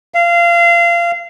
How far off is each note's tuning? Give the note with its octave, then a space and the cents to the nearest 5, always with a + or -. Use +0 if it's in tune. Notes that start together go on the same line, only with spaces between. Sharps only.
F5 -25